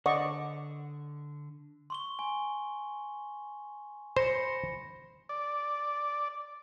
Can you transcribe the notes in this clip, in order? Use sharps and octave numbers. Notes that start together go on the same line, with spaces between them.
D3 D5 D#5 F#5 C#6
C6 C#6 G7
G#5
C5 B5 A#6 C#7
D5